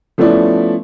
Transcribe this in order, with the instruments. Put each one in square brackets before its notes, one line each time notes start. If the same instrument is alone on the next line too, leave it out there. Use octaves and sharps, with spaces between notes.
[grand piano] F3 A3 B3 C#4 E4 D5